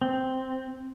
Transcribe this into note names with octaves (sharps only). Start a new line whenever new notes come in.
C4